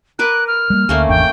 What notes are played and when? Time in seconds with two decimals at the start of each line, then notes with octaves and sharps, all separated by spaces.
0.19 A#4 B4 D6 F#6
0.47 F6
0.70 G3 A#3
0.89 D2 A3 A#3 C#4
1.08 G#1 E2 D4 G5